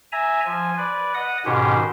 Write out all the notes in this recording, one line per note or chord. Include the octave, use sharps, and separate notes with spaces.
E5 G#5 A#5
F3 G#5
B4 D5
D#5 F#5 D#6
G#2 B2 D#3 C#4 G4 C5